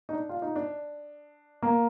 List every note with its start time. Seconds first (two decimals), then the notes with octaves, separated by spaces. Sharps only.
0.09 D#4
0.13 D4
0.29 F4
0.42 D#4
0.56 D4
1.62 A#3